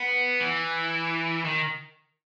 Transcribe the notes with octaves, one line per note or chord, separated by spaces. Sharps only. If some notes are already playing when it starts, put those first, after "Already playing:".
Already playing: B3
E3
D#3